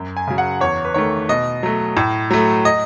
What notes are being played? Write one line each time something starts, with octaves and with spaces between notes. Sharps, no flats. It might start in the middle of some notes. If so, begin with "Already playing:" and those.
Already playing: F#2
G#5
C#3 F#3
F#5
E2 C#5
B4
D#3 A3 C#5
B2 D#5
F#3 A3
A2
F#3 A3
D#5